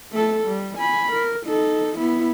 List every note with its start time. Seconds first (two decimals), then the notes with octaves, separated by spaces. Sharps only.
0.12 A3 A4
0.47 G3
0.78 G#5 B5
1.12 A#4
1.47 D#4 A4
1.98 B3 E4